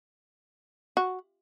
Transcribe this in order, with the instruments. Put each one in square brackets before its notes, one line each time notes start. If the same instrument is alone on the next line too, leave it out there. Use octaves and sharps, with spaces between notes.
[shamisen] F#4